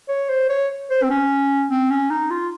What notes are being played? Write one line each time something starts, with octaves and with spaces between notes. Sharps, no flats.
C#5
C5
C#5
C5
C4
C#4
C4
C#4
D#4
F4